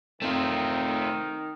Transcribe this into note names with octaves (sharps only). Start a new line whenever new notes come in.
D#3 A3 C4 F4